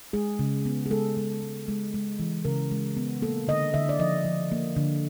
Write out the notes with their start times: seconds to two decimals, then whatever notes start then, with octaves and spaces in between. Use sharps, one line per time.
0.13 G#3 G#4
0.39 C#3
0.65 B3
0.86 G#4
0.91 G#3 A4
1.17 G#3
1.42 G#3
1.68 G#3
1.94 G#3
2.19 E3
2.45 C#3 A#4
2.71 G#3
2.97 B3
3.22 A#3 A4
3.48 D3 D#5
3.74 D3 E5
3.89 D5
3.99 F3 D#5
4.25 F3
4.52 A#3
4.76 D3